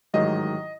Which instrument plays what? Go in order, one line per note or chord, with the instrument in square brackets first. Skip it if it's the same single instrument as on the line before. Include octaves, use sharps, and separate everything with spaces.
[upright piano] A1 G#2 D#3 F#3 D#5